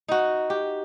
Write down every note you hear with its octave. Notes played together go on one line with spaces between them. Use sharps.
D#4 F#4
G4